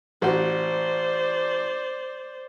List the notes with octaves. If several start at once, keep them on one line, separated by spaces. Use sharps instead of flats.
A1 F#4 C5 D5